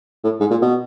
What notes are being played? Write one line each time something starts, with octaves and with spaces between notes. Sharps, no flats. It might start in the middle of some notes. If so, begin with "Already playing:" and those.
A2
G#2
A#2
B2